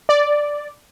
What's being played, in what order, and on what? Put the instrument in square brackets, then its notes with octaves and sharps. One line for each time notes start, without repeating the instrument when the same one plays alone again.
[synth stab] D5